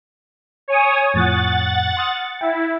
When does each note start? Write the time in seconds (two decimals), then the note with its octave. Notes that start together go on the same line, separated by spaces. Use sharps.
0.68 C#5 G#5 D#6
1.14 F2 A2 F3 F#5 A6
1.97 C6 D#6 F6
2.41 E4 G5